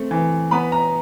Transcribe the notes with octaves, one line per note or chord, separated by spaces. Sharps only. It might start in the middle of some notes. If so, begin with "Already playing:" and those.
Already playing: A3 C4
E3
B3 B5
A#5